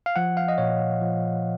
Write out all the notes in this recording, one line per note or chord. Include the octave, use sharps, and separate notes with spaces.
F5
F3 F#5
F5
D#5
A#2 C#5
F3